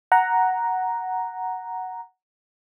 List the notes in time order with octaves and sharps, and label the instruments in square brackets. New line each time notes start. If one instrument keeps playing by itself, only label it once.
[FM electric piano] F#5 A#5